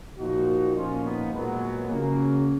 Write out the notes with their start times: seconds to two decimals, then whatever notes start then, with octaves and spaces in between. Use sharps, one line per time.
0.18 A#2 F3 D#4 F#4
0.75 A#2 F3 C#4 F4
1.04 B3 D#4
1.32 A#2 F#3 G#3 B3
1.90 C#3 F#3 A#3